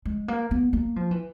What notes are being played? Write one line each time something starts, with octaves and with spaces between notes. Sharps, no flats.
G#3
A#3
B3
A#3
F3
E3